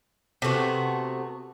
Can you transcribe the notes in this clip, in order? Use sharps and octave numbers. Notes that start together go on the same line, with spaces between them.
C3 A3 B3 F#4